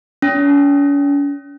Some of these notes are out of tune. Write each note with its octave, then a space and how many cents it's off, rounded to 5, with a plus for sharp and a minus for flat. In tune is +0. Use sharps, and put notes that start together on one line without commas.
C#4 +40